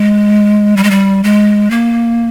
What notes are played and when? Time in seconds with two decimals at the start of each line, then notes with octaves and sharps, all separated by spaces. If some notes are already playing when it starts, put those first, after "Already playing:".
Already playing: G#3
0.77 G3
0.84 G#3
0.91 G3
1.24 G#3
1.71 A#3